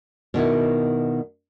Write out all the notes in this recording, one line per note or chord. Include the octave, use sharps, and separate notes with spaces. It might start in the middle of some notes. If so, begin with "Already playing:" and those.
B2 D#3 B3 E4